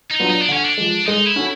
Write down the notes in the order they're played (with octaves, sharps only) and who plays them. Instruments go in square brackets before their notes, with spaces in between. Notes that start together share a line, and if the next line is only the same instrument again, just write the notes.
[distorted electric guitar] D#4
[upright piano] F#3 B3 D4 F4
[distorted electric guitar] D#4
D4
[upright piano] D3 [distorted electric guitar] C#4
[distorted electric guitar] D4
[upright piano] F3 G#3
[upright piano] G#3 [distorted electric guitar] D#4
[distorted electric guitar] E4
[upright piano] C#4 F#4 A4